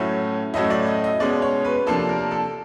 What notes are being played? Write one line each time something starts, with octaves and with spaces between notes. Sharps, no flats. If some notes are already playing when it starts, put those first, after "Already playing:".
Already playing: A2 F#3 A3 C#4
A2 F#3 A3 C#4 E4 D#5
D5
D#5
D#5
B2 G#3 C#4 D5
C#5
B4
C3 F3 A#3 D4 A4
A#4
A4